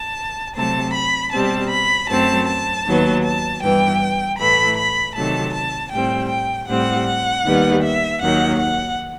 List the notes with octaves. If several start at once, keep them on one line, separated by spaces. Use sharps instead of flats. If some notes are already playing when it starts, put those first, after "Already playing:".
Already playing: A5
C3 F#3 A3 C4 A5
B5
B2 G3 C4 A5
B5
F#2 F#3 A3 C4 A5
A5
D#2 D#3 F#3 B3
A5
G2 E3 B3 G5
A2 E3 A3 B5
B5
C3 D#3 F#3 A3 A5
A5
A2 G3 C4 G5
G5
A2 G3 C4 F#5
F#5
D#2 D#3 G3 B3
E5
D#2 D#3 F#3 F#5
F#5